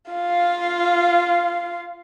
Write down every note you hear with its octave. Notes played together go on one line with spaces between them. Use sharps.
F4 F5